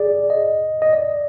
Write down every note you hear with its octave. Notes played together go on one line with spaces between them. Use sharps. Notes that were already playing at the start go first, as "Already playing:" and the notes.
Already playing: G#4 D5
D#5
D#5
D5